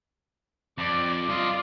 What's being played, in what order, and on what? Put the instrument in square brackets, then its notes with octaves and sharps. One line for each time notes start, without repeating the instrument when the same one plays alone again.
[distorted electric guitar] F2 [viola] D5
[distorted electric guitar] G2 D#5 [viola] F4 D5